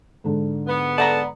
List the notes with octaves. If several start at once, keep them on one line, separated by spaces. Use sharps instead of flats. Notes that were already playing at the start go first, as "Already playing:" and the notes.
G#2 D3
B3
A4 D5 F#5 A#5